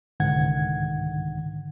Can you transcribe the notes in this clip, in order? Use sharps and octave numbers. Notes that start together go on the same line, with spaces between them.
C2 G#2 D3 D#3 F#5 G#6